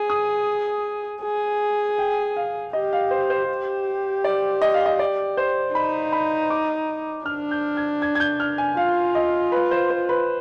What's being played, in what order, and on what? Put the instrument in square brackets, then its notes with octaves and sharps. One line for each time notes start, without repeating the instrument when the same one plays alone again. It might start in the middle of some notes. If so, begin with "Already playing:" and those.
Already playing: [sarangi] G#4
[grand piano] D#6
[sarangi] G#4
[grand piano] G5
F5
[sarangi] G4 [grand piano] D#5
[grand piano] F5
C5
C5
[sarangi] G4
[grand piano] D5
D#5
F5
D#5
D5
C5
[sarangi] D#4 [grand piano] B5
[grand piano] B5
D6
[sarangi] D4 [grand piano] F6
[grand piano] G6
G#6
G#6
G#6
G6
F6
G#5
[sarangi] F4 [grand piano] F5
[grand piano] D#5
B4
C5
C5
B4